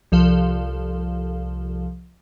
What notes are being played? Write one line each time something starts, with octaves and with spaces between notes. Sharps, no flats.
C2 F3 A4 F5